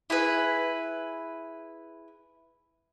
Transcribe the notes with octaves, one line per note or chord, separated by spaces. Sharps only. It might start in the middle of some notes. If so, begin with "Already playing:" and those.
E4 G#4 B4